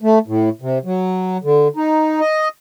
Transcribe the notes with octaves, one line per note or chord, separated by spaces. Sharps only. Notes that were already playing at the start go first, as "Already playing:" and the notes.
A3
A2
C3
F#3
D3
D#4
D#5